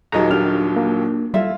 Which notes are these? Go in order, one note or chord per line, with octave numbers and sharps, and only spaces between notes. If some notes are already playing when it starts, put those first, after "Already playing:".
D#1 D#2 F#3 G#4 A4 D#5 A#5
D4 G4 A4 F6
A#3
G3 E4 F4 A4 E5